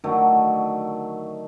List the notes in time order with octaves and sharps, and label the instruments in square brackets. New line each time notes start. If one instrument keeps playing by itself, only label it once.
[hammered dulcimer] D3 D#3 F#3 A3